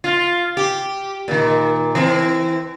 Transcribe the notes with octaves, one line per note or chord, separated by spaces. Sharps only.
F4
G4
A#2 D#3
E3 C4